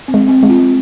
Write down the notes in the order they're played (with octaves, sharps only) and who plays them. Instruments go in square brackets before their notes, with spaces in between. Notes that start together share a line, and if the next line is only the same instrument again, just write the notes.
[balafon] C4
[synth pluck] G#3
[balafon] C4
[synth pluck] G#3
[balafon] F4